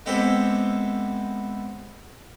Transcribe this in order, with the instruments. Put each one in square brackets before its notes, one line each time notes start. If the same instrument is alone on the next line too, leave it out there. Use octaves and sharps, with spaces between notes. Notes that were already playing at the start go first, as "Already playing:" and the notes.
[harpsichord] G#3 B3 C4 E4 G4 A4